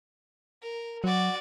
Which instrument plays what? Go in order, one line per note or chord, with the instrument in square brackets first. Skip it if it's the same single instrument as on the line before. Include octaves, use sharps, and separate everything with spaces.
[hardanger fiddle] A#4
[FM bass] F#3 [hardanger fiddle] F#4 D5